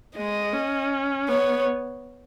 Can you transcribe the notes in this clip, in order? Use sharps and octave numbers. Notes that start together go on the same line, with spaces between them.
G#3 D#5
C#4
B3 C#5